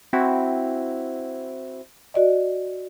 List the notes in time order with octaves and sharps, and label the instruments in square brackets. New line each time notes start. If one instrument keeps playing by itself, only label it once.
[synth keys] C4 E4 F#4
[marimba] F#4 D5 D#5